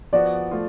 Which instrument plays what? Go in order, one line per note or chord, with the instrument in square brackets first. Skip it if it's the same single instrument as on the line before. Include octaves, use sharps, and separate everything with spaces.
[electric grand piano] F3 B3 F#4 [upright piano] D5
[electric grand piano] F3 A3 F4